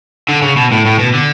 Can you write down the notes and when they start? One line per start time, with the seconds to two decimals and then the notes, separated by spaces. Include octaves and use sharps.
0.29 D3
0.42 C#3
0.56 B2
0.72 A2
0.86 A2
0.99 B2
1.14 D3